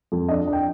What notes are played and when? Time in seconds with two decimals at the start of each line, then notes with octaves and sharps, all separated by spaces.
0.12 F2
0.29 D4 D#5
0.48 D4
0.53 G5